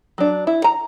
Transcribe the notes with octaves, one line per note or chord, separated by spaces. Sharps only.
F#3 D4
E4
A#5